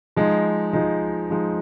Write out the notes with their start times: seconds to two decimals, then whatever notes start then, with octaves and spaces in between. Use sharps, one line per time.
0.16 F3 G#3 D#4
0.73 F3 G#3 D#4
1.30 F3 G#3 D#4